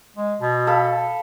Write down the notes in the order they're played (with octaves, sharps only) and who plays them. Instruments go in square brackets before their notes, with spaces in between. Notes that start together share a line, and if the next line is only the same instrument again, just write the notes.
[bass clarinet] G#3
B2
[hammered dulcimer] A4 F5 B5